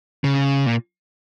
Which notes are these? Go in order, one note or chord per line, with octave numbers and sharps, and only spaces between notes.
C#3
A#2